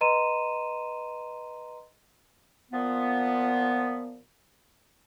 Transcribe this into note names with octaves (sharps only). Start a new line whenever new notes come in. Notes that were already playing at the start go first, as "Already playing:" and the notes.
B4 D#5 A#5 C6 D#7 E7
A#2 F3 B3